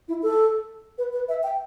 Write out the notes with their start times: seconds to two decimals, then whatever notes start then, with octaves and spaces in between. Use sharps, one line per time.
0.08 E4
0.23 A4
0.98 B4
1.13 B4
1.29 E5
1.43 G5